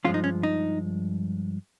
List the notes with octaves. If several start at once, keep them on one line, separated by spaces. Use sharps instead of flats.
G2 F3 G#3 C#4 F4
D#4
C#4
D#4